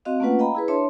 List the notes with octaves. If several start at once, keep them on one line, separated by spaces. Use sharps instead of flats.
C4 F#4 D#5 F5
A3 A#3 C#4 F4 B4 F#5
D#5 F5 G5 A#5 B5
E4 G#4 B4
D4 C#5 E5 A5 C6